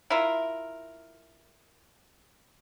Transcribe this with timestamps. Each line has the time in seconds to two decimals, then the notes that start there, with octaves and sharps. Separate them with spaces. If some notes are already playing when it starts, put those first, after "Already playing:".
0.10 E4 F4 A#4